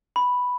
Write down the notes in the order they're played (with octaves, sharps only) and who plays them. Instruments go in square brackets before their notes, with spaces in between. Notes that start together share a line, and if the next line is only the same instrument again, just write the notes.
[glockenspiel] B5